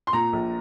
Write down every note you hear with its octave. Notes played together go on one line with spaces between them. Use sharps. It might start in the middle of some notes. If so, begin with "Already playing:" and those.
C6
A#2 A#5
A#1